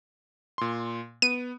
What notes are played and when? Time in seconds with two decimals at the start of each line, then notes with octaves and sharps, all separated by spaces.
0.58 A#2 C6
1.22 B3 D#7